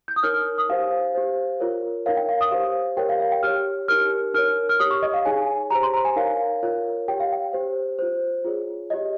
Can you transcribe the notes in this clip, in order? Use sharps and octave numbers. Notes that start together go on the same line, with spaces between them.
G6
D#6
D#4 A#4 C#5 F6
F6
D#6
D#4 G4 C5 F5
G4 C5
F4 A#4 C#5
D#4 A#4 C#5 F5
G5
F5
D#6
G4 C5 F5
G4 A#4 C#5 G5
F5
F5
G5
G4 C#5 F6
D#4 G4 A#4 F6
D#4 A#4 C#5 F6
F6
G4 C#5 D#6
C#6
D#5
F5
D#4 G#4 C#5 G#5
G4 C5 A#5
C6
A#5
G#5
D#4 A#4 C#5 F5
F4 A#4 C#5
G4 C#5 G5
F5
G5
G4 C5
F4 C5
F4 G#4 C#5
G4 C#5 D#5